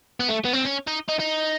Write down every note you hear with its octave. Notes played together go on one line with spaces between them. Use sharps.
B3
A3
B3
C4
C#4
D#4
D#4
D#4